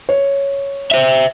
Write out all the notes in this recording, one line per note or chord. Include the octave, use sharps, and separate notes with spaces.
C#5
C5 E5